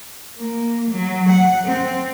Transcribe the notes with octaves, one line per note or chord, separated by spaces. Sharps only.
A#3
F#3
F#5
C4